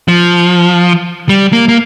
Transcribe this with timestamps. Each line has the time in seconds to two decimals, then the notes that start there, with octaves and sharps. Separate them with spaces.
0.08 F3
1.29 G3
1.53 A#3
1.68 A#3